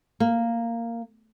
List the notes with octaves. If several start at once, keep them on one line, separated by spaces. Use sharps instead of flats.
A#3